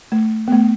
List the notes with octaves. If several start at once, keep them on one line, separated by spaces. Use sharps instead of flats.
A3
B3
A3